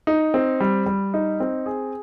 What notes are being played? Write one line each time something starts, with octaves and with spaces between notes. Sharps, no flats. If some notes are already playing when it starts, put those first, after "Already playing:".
D#4
C4
G3
G3
D#4
C4
G#4